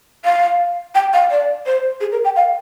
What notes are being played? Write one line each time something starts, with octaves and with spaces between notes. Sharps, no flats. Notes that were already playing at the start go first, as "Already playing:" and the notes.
F5
G5
F5
D5
C5
G#4
A#4
G5
F5